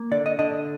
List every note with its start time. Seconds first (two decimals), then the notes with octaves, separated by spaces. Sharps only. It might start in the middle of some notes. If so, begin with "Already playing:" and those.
Already playing: A#3
0.11 D3 D5
0.26 D#5
0.39 D3 D#5